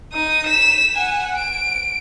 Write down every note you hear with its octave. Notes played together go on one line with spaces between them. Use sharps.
D#4 D#6
B6 E7
F#5 G#5
D7